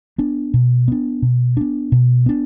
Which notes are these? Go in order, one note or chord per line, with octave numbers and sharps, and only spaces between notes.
B3 D4
B2
B3 D4
B2
B3 D4
B2
B3 D4